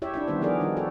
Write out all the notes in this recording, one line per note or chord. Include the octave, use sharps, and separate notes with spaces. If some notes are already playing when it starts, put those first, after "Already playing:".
E4 G4 C#5 E5
D4 E4 E5
D#3 G3 B3 C5
F3 B3 G#4 A#4 D5
D#3 G3 D#4
F#4 G4 A4